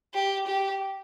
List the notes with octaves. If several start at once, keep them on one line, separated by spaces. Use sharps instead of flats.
G4
G4